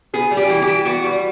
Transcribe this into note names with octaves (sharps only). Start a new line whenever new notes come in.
B3 G#4
G3
G4
E3
G4
E3
B3 F#4
G3